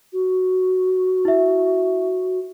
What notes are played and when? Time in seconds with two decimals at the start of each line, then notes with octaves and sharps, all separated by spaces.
0.13 F#4
1.25 E4 E5